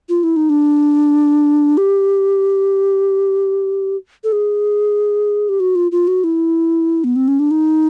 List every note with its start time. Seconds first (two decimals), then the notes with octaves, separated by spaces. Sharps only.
0.09 F4
0.23 E4
0.36 D#4
0.50 D4
1.77 G4
4.24 A4
4.32 G#4
5.49 G4
5.60 F#4
5.75 F4
5.92 F4
6.08 F#4
6.24 E4
7.04 B3
7.16 C4
7.28 C#4
7.39 D4
7.51 D#4